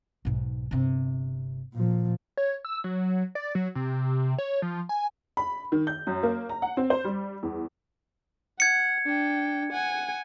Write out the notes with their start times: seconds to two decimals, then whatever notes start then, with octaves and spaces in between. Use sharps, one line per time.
0.25 B1 G#2
0.71 G1 C3
1.75 A#2 F3
2.37 C#5
2.65 E6
2.84 F#3
3.35 D5
3.55 F#3
3.75 C3
4.38 C#5
4.62 F3
4.89 G#5
5.37 B5
5.72 D#3
5.87 G6
6.07 F#2
6.23 A#3
6.49 A#5
6.62 F#5
6.77 C4
6.90 C5
7.04 G3
7.43 E2
8.60 F#5 G#6 C#7
9.06 D4 G5
9.72 F#5 G#5